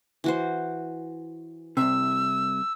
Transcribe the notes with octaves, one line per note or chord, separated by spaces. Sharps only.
E3 F#4 C5
C2 C3 E6